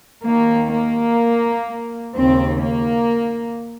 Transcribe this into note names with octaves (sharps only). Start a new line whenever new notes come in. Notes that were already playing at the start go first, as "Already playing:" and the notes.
D#2 D#3 A#3
A#3
D#2 C#3 C4
A#3